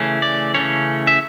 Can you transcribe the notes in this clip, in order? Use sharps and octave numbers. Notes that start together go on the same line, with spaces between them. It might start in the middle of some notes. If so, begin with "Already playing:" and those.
Already playing: C#3 E3 A3 C#4
D5
C#3 E3 A3 C#4 C#5
E5